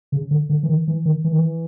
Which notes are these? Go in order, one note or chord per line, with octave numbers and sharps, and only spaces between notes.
C#3
D3
D3
E3
D#3
E3
D#3
E3
D#3
E3